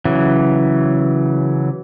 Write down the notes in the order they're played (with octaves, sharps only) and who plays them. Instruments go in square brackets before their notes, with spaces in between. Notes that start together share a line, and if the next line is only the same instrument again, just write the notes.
[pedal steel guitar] C#3 E3 F#3